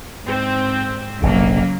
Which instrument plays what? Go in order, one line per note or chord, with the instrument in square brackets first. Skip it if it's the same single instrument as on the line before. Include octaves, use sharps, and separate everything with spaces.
[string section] G#2 C4
[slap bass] F1 A#1 F2 [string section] C#3 F#3 A#3